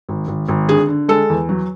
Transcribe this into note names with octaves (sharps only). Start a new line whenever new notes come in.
G#1
G#1
G#1
D3 G#4
D3
G#3 A4
E2
F#3